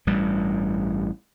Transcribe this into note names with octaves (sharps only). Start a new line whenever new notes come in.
A1 G2 G3